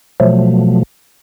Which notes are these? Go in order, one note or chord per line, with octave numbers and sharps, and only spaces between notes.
B2 F3 F#3 A3